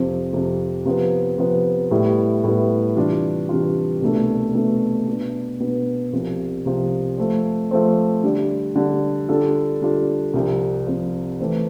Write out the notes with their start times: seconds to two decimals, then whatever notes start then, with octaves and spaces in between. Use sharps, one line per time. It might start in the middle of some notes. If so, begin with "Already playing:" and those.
Already playing: F2 C3 F3 C4
0.33 F2 C3 F3 C4
0.85 C3 F3 B3
1.38 C3 F3 B3
1.91 A2 G3 B3 E4
2.44 A2 G3 B3 E4
2.96 C3 E3 G3 D4 F4
3.49 C3 E3 G3 D4 F4
4.01 C2 B2 A3 D4
4.54 C2 B2 A3 D4
5.07 B2 B3 D4
5.60 B2 B3 D4
6.13 C2 C3 F3
6.65 C2 C3 F3
7.18 F3 A3 C4
7.71 F3 A3 C4
8.23 D3 G3 D4
8.76 D3 G3 D4
9.29 D3 G3 D4 F4 A4
9.81 D3 G3 D4 F4 A4
10.34 C2 C3 F3
10.87 C2 C3 F3
11.40 E3 A3 C4